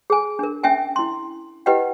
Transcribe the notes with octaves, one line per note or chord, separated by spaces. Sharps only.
G#4 G#5
D4 A#4
C#4 E5 G5 G#5
E4 C6
E4 G4 B4 D#5 F#5 G5